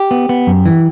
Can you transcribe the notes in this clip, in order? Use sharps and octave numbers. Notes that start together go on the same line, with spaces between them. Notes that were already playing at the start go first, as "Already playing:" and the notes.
Already playing: G4
B3
B3
F#2
E3